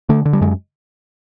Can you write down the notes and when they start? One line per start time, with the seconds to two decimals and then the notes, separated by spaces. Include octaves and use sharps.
0.09 D3 A3
0.25 D3
0.33 G3
0.41 F#2 G#3